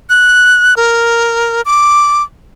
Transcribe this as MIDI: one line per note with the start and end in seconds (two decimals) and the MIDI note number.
0.10 0.75 90
0.77 1.62 70
1.65 2.23 86